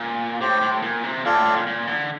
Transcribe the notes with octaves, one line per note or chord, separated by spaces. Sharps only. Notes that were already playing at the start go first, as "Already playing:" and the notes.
Already playing: A#2
A2 G4 C5 G5
A2
A#2
C3
A#2 F4 A4 D5 F5
A2
A2
A#2
A#2
D3